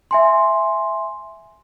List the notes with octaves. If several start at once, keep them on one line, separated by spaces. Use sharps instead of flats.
E5 G#5 C6